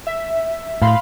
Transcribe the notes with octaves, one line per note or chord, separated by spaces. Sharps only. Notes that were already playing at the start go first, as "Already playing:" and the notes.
E5
A2 F5 B5 C6